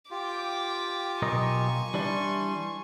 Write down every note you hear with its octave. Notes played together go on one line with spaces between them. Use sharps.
F4 G4 G5 D6
B1 A#4 D#5 G#5 C#6
E3 G3 D4 C6